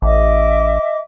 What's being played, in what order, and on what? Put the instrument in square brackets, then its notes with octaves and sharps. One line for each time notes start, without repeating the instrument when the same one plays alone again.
[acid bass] A1 [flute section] D#5 E5 D6